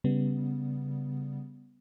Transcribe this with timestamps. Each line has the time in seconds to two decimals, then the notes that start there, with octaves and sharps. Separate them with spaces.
0.04 C#3 G3 B3